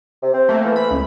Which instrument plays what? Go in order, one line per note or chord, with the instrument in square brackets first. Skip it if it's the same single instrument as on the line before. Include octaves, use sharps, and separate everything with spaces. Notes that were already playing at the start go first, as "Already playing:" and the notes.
[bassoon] C3
C4
[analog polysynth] A3 A#3
[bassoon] E3
[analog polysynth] B5
C#2